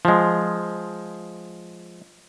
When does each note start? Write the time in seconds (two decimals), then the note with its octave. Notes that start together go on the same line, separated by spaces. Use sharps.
0.05 F3 G#3